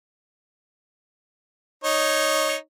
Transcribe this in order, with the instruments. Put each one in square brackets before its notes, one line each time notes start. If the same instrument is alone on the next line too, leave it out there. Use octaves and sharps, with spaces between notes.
[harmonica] D#4 C#5